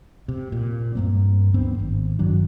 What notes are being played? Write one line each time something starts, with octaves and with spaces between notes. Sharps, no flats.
C3
A#2
G2 A#3 C4
D1 B3 C4 D4
G#1
G2 D#3 F#3 D4